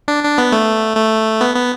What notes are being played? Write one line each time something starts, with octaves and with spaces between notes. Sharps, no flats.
D4
D4
B3
A3
A3
B3
B3